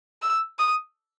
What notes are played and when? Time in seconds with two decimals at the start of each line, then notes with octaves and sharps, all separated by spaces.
0.22 E6
0.59 D#6